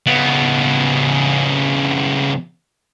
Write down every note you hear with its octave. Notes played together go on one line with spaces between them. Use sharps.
C#3 B3